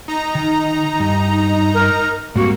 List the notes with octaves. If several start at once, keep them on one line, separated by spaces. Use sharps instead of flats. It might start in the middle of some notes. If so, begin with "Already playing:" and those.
D#4 A#5
D#3
G2
A#4
G#2 G3 A#3 C4 F#4